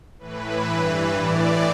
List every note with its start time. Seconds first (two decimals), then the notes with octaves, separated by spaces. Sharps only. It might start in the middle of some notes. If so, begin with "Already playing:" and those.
0.19 A2 E3 B4
0.67 G2 E3
1.13 A2 E3 D5